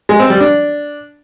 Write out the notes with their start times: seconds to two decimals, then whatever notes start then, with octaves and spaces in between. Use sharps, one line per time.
0.09 G#3
0.20 C4
0.30 G3
0.40 D4